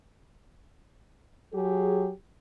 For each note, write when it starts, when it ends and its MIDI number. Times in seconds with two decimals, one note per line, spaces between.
1.53 2.11 54
1.53 2.11 67
1.53 2.11 68